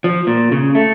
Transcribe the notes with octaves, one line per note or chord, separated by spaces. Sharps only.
F3
A#2
C#3
A3